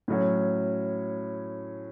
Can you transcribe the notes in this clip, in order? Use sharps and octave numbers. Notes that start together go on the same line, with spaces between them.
A2 F#3 C#4